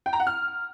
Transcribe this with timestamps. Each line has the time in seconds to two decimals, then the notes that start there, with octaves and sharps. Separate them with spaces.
0.06 G5
0.13 A#5
0.20 F#5
0.27 F6